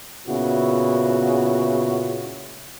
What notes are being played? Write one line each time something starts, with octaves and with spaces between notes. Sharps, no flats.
A#2 C#3 B3 E4 F#4